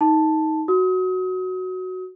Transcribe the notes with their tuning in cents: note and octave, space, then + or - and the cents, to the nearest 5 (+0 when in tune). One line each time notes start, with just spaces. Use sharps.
D#4 +20 A5 +0
F#4 +0 D#6 +35